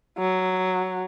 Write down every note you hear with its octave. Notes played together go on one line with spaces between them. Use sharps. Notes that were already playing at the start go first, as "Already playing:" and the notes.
F#3